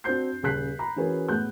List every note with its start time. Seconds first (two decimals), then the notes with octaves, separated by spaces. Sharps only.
0.04 C4 D4 F#4 C5 G6 C7
0.43 D#1 C#3 G#4 F#6 B6 C7
0.79 A#5 B5
0.96 E3 C#4 F#4 G#4 A#4 B4
1.28 A2 G#3 B3 F#6 G6